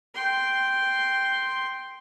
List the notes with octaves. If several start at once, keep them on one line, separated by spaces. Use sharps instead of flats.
G5 C6